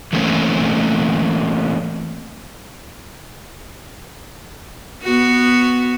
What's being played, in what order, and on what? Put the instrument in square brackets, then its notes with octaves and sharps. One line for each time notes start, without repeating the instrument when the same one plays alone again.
[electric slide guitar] E3 A3 A#3 C4 C#4
[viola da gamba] B3 F#4